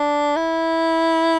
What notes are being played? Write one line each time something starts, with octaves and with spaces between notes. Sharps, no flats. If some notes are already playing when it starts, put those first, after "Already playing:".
Already playing: D4
E4